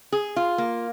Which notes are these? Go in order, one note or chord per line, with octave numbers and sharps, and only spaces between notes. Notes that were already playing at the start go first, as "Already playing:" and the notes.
G#4
F4
A#3